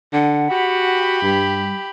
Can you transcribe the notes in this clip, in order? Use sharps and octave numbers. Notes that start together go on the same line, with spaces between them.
D3 F#5
F#4 G4 B5
G2 G3